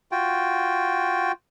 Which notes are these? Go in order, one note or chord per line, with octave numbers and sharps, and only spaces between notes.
F4 F#4 G5